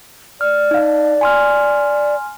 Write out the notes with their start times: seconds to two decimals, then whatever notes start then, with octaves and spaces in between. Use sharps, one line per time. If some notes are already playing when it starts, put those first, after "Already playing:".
0.41 D5 F6
0.71 D#4 F5
1.21 G#5 C6 F6